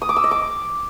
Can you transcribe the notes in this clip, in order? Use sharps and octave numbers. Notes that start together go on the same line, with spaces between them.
D#6
D6
E6
D#5
D6